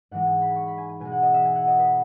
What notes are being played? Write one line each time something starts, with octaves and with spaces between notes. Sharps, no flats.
G#2 E3 G#3 F#5
G#5
B5
C#6
B5
G#5
G#5
B2 G#3 G#5
F#5
D#5
E5
G#5
F#5
D#5
B4